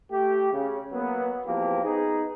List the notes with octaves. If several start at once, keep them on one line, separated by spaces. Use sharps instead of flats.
A3 G4
C#3
F#3 A#3 B3
E2 F3 A#3 C4 G4
B3 D#4 G#4